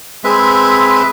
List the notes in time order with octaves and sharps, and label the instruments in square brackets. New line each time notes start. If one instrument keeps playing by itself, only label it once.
[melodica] G#3 C4 B4 E5